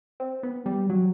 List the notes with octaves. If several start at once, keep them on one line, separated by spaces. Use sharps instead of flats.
C4
B3
G3
F#3